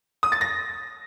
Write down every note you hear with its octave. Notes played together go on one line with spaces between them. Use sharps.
D#6
A6
A#6